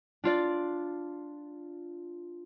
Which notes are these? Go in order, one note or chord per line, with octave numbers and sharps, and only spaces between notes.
D4 F4 D5